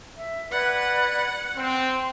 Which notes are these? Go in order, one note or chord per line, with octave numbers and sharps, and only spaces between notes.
E5
B4 D5 F#5 G#6
C4 C6